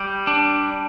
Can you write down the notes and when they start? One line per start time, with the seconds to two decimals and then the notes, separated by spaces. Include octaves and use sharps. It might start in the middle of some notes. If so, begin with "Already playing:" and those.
Already playing: G3
0.27 D4